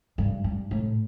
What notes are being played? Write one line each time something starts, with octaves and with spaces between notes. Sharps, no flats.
G2
G2
A2